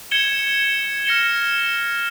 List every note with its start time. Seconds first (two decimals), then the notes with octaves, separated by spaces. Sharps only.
0.11 G#6 C#7 E7 G7
1.05 F6 A#6 C#7 E7 G7